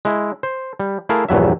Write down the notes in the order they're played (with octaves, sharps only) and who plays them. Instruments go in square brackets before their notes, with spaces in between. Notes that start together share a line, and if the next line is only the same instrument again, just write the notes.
[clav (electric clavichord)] G#3 E4
C5
G3
A3 E4 G#4 A#4 F5 A5
A#1 E2 G2 F#3 E5